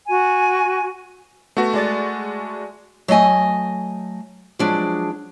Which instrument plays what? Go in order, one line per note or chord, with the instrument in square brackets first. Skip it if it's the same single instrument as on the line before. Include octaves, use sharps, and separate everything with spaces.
[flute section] F#4 G#5
[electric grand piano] A3 F#4 [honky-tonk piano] B3
[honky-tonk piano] G#3 D5 A6
[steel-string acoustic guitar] F#3 A3 D#5 G#5
F3 F#3 G#3 D4